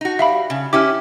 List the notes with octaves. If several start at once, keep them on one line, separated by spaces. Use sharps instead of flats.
D#4 F#4
G3 E5 F5 B5
C#3
C#4 E4 G4 D6 F6